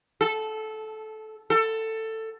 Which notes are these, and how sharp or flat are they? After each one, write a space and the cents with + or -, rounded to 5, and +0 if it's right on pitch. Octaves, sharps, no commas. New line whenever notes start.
A4 -15
A4 +15